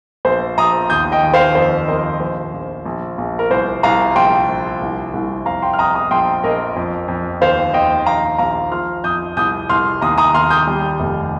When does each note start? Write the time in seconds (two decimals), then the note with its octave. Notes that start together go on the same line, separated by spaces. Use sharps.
0.25 A#1 C5
0.58 A#1 A#5 D#6
0.90 D#2 D#6 G6
1.12 D#5 G5
1.23 D#2
1.34 C5 F5
1.55 F2 C5
1.88 F2 A#4 D#5
2.20 A#1 C5
2.54 A#1
2.85 A#1
3.18 A#1
3.39 A#4
3.50 C2 C5
3.83 C2 F5 A#5
4.16 A#1 G5 C6
4.49 A#1
4.82 C2
5.14 C2
5.46 F2 F5 A#5
5.62 G5 C6
5.73 F6
5.78 F2 A#5 D#6
5.95 A#5 D#6
6.11 A#1 G5 C6
6.44 A#1 A#4 D#5
6.76 F2
7.08 F2
7.41 D#2 C5 F5
7.74 D#2 D#5 G5
8.06 A#1 F5 A#5
8.38 A#1 F5 A#5
8.72 F3 C6 F6
9.04 F2 D#6 G6
9.37 C2 D#6 G6
9.69 C2 C6 F6
10.01 D#2 A#5 D#6
10.18 A#5 D#6
10.34 D#2 C6 F6
10.50 D#6 G6
10.67 G3
11.00 F1